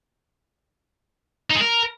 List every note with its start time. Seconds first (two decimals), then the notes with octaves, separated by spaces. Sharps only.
1.51 D#4
1.56 G#3
1.61 A#4